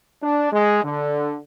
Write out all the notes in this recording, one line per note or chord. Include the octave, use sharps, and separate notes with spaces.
D4
G#3
D3